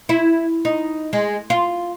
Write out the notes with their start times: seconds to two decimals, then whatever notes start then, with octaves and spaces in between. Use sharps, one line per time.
0.09 E4
0.65 D#4
1.13 G#3
1.50 F4